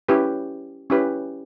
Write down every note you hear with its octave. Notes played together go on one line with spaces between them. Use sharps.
C#4 E4 G4 B4
C#4 E4 G4 B4